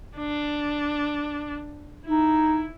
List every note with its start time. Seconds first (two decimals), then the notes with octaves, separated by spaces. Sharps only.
0.17 D4
2.06 D#4 E4